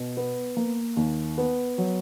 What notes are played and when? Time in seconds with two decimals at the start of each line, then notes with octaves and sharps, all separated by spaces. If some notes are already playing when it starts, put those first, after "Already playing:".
Already playing: B2
0.17 B3
0.57 A#3
0.97 D#2
1.38 B3
1.78 F#3